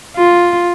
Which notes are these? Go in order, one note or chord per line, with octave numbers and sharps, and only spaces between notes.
F4